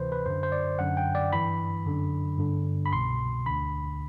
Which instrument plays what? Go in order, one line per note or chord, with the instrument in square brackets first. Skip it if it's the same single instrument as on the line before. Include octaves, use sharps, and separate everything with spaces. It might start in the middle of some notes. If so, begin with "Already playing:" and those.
Already playing: [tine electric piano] D2 C3 E3 B4 C5
B4
F#2 D3 C5
C5
D5
F#2 D3 F#5
G5
D5
G2 E3 B5
F#2 D3
G2 D3
B5
C2 B2 C6
D2 D3 B5